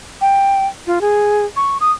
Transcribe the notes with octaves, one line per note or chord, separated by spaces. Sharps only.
G5
F4
G#4
C#6
D#6